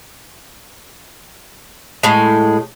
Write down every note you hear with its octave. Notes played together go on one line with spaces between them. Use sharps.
A2 G#3